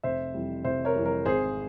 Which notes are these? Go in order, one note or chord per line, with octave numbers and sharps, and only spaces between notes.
F1 C5 E5
F2 E3 G3
F1 C5 E5
A#4 C#5
F2 E3 G3
A#4
G#1 G#4 C5